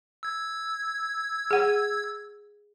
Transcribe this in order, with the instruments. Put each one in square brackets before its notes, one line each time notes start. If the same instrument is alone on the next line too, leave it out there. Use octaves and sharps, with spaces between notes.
[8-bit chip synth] E6 G#6
[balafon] G#4 F#5